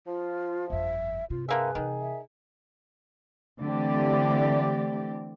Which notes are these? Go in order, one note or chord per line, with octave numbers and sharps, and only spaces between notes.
F3 F4
G1 F2 E5
G2 C3 F4
D3 A#3 G#4 B4 E5
C3 D#3 E3
E5
D3 E3 A3 C4 G4 D5